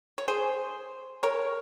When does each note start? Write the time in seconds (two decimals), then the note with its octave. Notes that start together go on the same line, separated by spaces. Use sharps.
0.18 C#5
0.28 G#4 C5
1.23 A#4 C#5